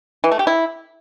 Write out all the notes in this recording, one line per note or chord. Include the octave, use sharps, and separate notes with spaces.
E3
A3
G4
E4